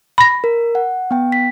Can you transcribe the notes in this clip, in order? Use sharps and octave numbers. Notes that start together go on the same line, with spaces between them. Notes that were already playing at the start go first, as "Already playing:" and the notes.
B5 A#6
A#4
F#5
B3 G5
B6